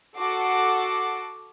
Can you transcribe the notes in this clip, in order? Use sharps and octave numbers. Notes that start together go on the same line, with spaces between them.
F#4 A4 F#5 D6 C7